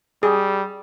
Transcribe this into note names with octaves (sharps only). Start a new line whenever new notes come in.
G3 G#4